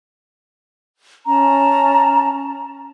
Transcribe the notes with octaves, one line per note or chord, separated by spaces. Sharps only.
C#4 A5 A#5